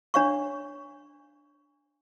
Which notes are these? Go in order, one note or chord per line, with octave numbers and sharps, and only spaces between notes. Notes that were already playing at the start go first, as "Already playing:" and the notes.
D4 C#5 F5 C#6